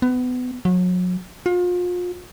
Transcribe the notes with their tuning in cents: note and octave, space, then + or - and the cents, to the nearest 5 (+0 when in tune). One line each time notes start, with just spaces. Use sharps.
B3 +25
F#3 -35
F4 +35